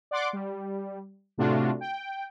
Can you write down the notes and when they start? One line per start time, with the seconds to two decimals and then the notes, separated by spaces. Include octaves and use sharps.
0.11 D5 F#5 C6 D6
0.33 G3
1.38 A2 C3 A3 D4 F4 F#4
1.81 G5